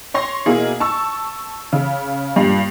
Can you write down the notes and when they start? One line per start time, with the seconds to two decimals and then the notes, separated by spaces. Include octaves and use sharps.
0.14 C#5 C6 A#6
0.46 B2 A#3 E4 G#4
0.80 A5 C#6 E6
1.73 C#3
2.36 G2 A#2